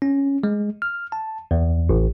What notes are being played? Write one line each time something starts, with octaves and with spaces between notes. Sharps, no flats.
C#4
G#3
F6
A5
E2
A1